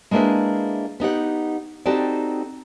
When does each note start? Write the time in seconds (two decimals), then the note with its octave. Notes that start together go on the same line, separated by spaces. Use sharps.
0.11 G#3 A#3 D4 E4 G#4 B4
1.00 B3 D#4 G4 F#5
1.86 C4 D#4 F#4 G4 A4 D5